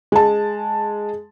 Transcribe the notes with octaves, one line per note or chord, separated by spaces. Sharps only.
G#3 A5